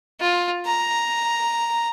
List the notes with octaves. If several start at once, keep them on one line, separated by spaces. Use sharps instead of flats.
F4
A#5